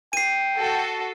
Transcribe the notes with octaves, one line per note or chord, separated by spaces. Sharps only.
G5 C7 D#7
F#4 A4